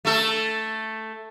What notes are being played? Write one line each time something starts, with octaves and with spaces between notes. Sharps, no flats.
A3 A4